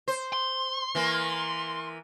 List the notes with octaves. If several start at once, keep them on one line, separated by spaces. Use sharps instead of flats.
C5
C6
E3 A#3